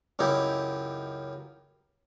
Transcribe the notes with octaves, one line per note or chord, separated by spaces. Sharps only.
C#2 F#2 D#4 E4 G4